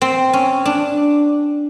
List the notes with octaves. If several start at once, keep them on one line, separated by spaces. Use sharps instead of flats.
C4
C#4
D4